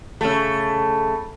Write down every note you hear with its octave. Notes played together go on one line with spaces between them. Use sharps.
C#3 A3